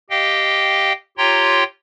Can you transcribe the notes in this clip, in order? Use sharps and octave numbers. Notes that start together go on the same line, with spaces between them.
G4 D#5 F5 G5
F4 G4 C#5 G5 A#5 C6